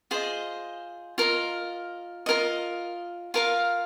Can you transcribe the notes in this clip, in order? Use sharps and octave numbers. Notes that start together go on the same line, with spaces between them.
F4 G#4 C5 D#5
F4 A#4 D#5
F4 A#4 D#5
F4 A#4 F5